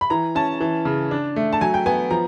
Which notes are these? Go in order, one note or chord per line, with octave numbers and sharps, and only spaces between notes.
B5
E3 A#5
C#4 A5
E3
C#3
D4
A3
A5
F#3 G#5
G5
B3 G#5
F3 A#5